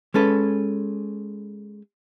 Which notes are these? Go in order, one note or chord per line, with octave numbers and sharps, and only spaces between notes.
G#3 C#4 A4 B4